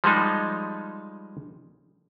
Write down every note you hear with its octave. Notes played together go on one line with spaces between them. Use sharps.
F3 G3 G#3 D#4